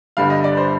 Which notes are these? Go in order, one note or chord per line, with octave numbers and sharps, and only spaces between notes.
G1 G2 D3 G3 F5
D#5
D5
C5